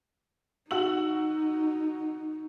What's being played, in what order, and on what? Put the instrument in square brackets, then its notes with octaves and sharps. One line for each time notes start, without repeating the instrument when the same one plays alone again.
[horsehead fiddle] D#4 [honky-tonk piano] F#4 E6 F#7